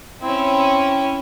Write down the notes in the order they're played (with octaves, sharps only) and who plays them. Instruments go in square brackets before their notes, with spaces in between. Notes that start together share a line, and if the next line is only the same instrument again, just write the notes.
[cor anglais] C4 [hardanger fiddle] C#4 E4